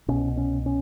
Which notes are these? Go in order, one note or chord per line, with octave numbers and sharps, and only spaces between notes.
C2 B2 C#4
C#4
C#4